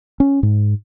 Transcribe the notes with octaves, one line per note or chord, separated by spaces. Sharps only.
C#4
G#2